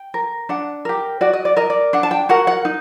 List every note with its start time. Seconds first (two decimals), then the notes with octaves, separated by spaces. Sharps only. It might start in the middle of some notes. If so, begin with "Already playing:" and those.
Already playing: G5
0.14 A#4
0.49 D4 F#5
0.85 G4 A#4
1.21 F#4 D5
1.33 D#5
1.45 D5
1.57 A#4 D#5
1.70 D5
1.93 D4 F#5
2.03 A5
2.11 G5
2.29 F#4 A#4 F#5
2.47 F#5
2.65 D#4